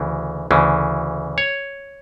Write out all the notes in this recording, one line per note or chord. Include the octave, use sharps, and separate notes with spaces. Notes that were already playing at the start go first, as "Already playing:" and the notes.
Already playing: D2 C#3 E3
D2 C#3 E3
C#5